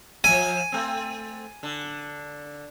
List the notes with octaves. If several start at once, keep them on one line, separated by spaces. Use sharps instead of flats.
F3 F#3 E5 G#5
A3 C4
D3